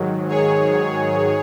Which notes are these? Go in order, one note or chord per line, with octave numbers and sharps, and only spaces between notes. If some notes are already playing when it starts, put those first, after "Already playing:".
Already playing: G#2 D#3 F#3
G#4 C#5